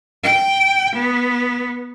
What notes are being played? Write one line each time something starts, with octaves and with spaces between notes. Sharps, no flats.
G5
B3